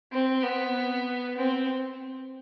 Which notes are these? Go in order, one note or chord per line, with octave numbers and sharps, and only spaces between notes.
C4
B3
C4